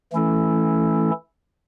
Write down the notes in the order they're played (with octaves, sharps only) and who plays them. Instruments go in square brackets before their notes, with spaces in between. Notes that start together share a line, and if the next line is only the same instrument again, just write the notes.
[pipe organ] E3 A3 C#4 E4 A4